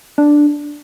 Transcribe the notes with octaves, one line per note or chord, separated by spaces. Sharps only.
D4